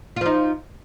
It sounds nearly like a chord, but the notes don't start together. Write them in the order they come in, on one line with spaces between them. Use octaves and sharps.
F4 F3 D#4